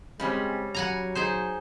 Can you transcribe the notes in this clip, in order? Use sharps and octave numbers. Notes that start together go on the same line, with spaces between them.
C#3 G3 G#3 C4 C#4
F#3 F#5 G#5 A#5
D#4 G#4 C5